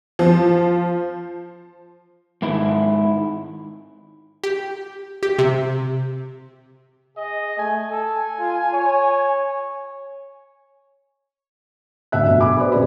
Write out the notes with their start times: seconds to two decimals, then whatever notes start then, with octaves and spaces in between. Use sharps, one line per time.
0.19 F3
2.42 G#2 D#3 E4
4.44 G4
5.23 G4
5.39 C3
7.17 G#4 D#5
7.58 A3 G#5
7.91 A4 G#5
8.40 F4
8.74 C#5
12.12 G1 D2 E5 F#6
12.27 B1
12.41 G#5 B5 D6
12.58 F#4 B4 C5 D5 D#5
12.72 D#1 C#4 G#4 B5